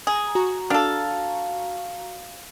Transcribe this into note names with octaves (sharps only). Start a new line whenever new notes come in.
G#4 G#5 A#5
F#4 A#5 C#6
D4 A4 F5